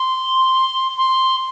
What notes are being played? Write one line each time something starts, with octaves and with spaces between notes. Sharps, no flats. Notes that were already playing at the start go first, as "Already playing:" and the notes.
Already playing: C6
C6